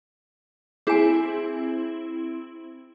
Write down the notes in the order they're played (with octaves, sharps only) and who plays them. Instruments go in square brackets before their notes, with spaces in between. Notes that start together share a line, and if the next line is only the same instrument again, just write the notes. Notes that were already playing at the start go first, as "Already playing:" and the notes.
[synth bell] C4 E4 [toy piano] G#4 G#5